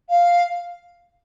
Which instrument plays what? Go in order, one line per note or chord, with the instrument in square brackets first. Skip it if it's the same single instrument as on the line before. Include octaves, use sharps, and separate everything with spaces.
[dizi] F5